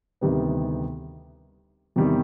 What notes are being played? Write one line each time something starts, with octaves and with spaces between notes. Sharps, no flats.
D2 C3 D#3 G3 B3
E2 C3 D#3 G3